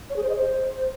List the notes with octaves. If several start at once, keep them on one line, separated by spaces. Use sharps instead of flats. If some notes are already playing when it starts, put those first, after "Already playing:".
C#5
G#4
C5
D#5
C5